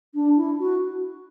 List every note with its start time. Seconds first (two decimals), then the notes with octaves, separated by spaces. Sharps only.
0.14 D4
0.36 E4
0.59 F#4